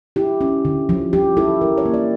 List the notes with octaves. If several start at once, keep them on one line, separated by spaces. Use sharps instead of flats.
E4 G4
C#4
D3
F3
F3 G4
E4 A4
F3 A#4
C#5
A#3
D5